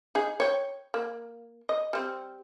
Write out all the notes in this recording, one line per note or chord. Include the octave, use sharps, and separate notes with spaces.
D#4 G#4
C#5 G5
A#3
D#5
G3 C4